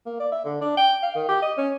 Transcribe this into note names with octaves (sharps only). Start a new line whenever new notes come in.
A#3
D5
E5
D3
D4
G5
F5
D#3
G4
D#5
C#4